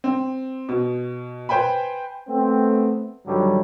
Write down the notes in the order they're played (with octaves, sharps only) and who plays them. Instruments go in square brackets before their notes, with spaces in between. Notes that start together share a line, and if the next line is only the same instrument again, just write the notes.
[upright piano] C4
B2
B4 C5 G5 G#5 B5
[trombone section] A3 B3 C4
G2 D3 D#3 F#3 G3